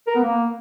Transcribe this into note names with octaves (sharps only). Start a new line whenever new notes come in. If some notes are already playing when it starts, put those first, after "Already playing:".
A#4
B3
A#3